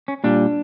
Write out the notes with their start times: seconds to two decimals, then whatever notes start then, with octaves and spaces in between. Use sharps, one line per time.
0.08 C#4
0.24 A#2 G3 D4